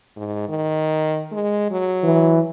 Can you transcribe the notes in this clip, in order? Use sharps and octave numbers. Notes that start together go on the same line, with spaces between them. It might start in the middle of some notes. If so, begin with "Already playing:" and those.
G#2
D#3
G#3
F#3
E3